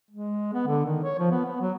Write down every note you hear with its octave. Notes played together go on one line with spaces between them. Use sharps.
G#3
B3
D3
D#3
C#5
F3
B3
B3
F#3